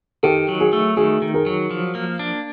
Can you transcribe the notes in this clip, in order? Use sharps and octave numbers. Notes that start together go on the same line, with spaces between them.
D#3 G4 A4
F#3
F#4 G#4
A3
D#3 F#4 G#4
D#3
G#4 A#4
F#3
F3
A#3
D4